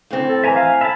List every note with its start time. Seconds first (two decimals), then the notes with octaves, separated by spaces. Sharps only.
0.11 A2 C4
0.28 A4
0.44 E3 E5 G#5 A#5
0.56 F5
0.81 E5 A5 B5